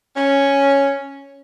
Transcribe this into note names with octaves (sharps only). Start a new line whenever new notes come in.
C#4